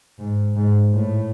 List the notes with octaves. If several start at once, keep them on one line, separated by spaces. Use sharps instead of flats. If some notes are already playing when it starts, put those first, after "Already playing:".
G#2
G#2
A2